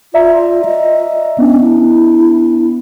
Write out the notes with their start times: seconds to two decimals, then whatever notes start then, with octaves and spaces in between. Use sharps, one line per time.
0.14 F4 D5 E5 A#5
0.65 D#5
1.38 B3 C#4 D4
1.61 E4